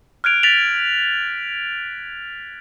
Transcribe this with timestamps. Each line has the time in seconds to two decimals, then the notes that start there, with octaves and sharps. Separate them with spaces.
0.24 F6 F#6 G#6 D7 F7
0.43 A6 B6 D7 F7 F#7